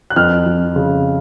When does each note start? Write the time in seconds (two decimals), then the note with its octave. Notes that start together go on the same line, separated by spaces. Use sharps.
0.10 F#6
0.16 F2 F6
0.46 F2
0.76 C#3